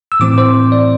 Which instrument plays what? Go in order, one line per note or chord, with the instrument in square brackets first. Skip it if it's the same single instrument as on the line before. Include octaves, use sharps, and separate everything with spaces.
[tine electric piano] E6
A2 E3 C4 D6
C5
D5